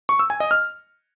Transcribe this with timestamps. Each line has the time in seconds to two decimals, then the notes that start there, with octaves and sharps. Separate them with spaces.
0.09 C#6
0.19 E6
0.30 G#5
0.40 D#5
0.51 F6